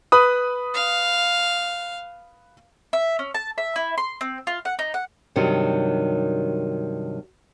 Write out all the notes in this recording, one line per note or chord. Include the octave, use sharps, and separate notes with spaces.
B4 B5 D#6
F5
E5
C#4
A5
E5
E4
C6
C4
F4
F#5
D#4
F#5
G2 C3 D#3 F#3